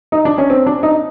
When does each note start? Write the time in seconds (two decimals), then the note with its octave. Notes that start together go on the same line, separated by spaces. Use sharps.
0.12 D#4
0.25 D4
0.38 C#4
0.50 C4
0.67 D4
0.83 D#4